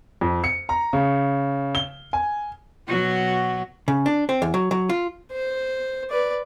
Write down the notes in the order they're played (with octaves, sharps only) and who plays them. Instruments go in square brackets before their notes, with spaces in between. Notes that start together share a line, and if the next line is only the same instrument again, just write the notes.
[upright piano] F2
C#7
A#5
C#3
G7
G#5
[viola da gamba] B2 F#3 F#4
[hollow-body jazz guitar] C#3
D4
C4
E2
F#3
F#3
F4
[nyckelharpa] C5
B4 D5